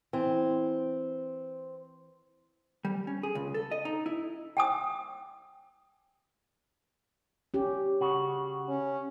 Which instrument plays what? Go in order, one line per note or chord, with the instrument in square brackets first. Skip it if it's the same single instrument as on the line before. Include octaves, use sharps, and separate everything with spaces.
[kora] E3 [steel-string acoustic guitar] C4
[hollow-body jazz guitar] G3
C#4
G#4
C#2
A4
D#5
D#4
E4
[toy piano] G5 G#5 D#6
[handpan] C#4 G4
[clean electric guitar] C#3 F#4
[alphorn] C#4